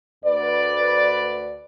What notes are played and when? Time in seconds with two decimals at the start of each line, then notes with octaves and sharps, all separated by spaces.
0.24 D2 B4 D5